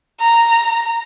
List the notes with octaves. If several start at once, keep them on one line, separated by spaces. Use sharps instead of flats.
A#5